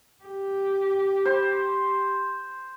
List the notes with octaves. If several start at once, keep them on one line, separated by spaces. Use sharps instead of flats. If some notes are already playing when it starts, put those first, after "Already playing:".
G4
C5